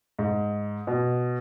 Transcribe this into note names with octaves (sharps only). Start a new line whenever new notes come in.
G#2
B2